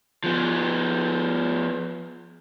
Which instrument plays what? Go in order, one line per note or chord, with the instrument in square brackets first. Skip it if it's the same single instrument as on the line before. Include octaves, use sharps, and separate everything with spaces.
[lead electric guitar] F3 B3